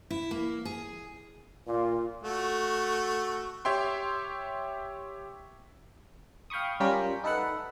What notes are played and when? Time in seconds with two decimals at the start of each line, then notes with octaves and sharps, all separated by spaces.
0.10 E4
0.31 A#3
0.65 G#4
1.67 A#2 F4
2.23 A3 F#4
3.65 G4 C#5 E5 G5 C6
6.50 F5 G5 B5 C#6 D#6
6.80 G3 C#4 F4 A#4 G5 B6
7.24 D#4 A4 B4 E5 F#5